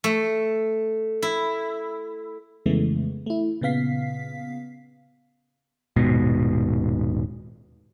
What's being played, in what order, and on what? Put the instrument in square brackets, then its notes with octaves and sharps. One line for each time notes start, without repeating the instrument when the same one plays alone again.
[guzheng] A3
E4
[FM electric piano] F2 C#3 E3 G#3 A3 B3
A3 E4
A#2 C#3 B3 F5 B6 C7
[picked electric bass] D#1 G#2 B2